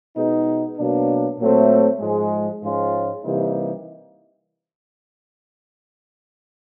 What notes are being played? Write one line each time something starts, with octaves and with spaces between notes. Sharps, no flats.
B2 G#3 B3 D#4
B2 F#3 A#3 D4
A#2 F#3 A3 C4
G#2 F3 G#3
G#2 F3 G#3 C#4 F4
C3 E3 G3 A#3 D#4